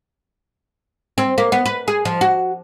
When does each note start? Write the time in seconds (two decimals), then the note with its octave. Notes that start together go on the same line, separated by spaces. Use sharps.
1.18 C4
1.38 A#3
1.52 B3
1.66 B4
1.88 G#4
2.05 F3
2.21 F#4